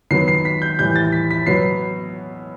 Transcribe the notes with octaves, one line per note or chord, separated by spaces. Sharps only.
D#3 F#3 B3 C7
C7
B6
G6
A2 E3 G3 G6
A6
B6
B6
B2 F#3 B3 C7